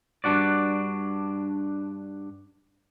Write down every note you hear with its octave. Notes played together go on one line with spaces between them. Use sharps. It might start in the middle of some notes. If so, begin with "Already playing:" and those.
G2 D4 F#4 D5